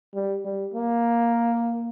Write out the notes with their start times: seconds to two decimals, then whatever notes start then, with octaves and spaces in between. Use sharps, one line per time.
0.15 G3
0.45 G3
0.74 A#3